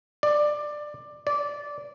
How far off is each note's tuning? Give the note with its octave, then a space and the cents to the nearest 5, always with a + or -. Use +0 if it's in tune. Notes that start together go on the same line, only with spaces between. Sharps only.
D5 +15
D5 -15